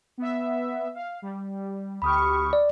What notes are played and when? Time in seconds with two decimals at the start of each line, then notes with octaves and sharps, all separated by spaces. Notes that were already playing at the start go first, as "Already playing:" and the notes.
0.18 B3 E5
0.95 F5
1.22 G3
2.02 D2 G4 B5 C#6 D#6 F6
2.53 D5